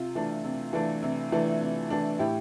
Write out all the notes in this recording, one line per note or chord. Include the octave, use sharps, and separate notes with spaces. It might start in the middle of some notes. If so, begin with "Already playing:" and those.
Already playing: C3 F4
E3 A3 D4
C3
E3 A3 D4
C3
E3 A3 D4
C3
E3 A3 D4
A2 E4 G4